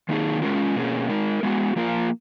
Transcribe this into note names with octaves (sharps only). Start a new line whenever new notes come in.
D#3 A#3 D#4 G#4
G#3 C#4 F4 A#4
B2 A#3 C#4 G#4
G#3 D#4 A#4
G#3 B3 F#4
F3 A#3 F4 A#4